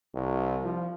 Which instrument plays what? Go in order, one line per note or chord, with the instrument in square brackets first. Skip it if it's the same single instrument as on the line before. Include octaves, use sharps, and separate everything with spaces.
[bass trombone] C2
F3